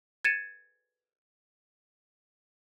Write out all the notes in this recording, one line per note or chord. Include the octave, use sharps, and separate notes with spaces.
G#6 A6 C#7 D#7 E7